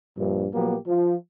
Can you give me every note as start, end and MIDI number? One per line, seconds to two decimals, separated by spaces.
0.18 0.47 34
0.18 0.47 43
0.53 0.76 46
0.53 0.76 53
0.53 0.76 54
0.53 0.76 58
0.53 0.76 59
0.53 0.76 67
0.87 1.15 53